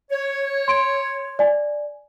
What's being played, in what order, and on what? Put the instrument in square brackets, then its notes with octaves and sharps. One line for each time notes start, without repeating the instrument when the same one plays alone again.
[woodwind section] C#5
[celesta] C6 D7
D5 G#5